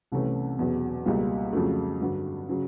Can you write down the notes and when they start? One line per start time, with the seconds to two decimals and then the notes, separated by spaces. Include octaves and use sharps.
0.12 C2 C3 E3 A3 C#4
0.59 E2 B2 F#3
1.06 C#2 B2 G3 A#3
1.53 F2 C#3 F#3 A3
2.00 G2 D3 F#3
2.49 C#3 F#3